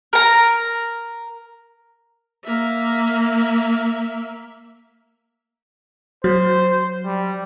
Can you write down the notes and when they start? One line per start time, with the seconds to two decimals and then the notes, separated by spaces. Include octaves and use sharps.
0.13 A#4 A#5
2.45 A#3 E5
6.24 F#3 C5
7.06 G3